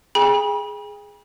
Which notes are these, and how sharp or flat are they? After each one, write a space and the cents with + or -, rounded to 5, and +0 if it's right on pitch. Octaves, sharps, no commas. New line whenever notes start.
G#4 +0 G5 +45 B5 -40